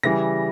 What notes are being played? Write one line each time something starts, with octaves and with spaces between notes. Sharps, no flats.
C#3 E3 G3 A#6